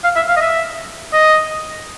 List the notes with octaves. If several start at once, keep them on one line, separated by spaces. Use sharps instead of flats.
F5
E5
F5
D#5
E5
D#5